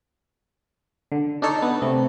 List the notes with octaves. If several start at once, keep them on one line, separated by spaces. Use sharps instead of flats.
D3
D4 D#4 A4 C#5
B3
C3 A3